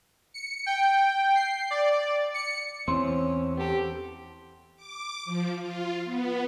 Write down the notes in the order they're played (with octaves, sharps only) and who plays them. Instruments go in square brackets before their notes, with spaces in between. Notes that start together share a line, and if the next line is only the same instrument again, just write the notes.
[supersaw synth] C#7
G5
C7
D5
C#7
[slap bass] E2 E3 [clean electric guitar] C4 [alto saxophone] C#4 [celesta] C6
[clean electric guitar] B3 A4 [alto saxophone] G4
[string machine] D6
F3
F4
B3